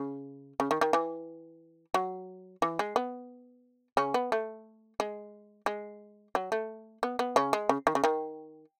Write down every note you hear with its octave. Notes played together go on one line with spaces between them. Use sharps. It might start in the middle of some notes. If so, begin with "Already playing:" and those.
Already playing: C#3
C#3
D#3
D#3
E3
F#3
E3
G#3
B3
C#3 C#4
B3
A3
G#3
G#3
F#3
A3
B3
B3
C#3 C#4
G#3
C#3
D#3
C#3
D#3